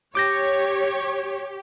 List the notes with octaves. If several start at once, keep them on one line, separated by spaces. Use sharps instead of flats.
G4 C#5 D6 G6 A#6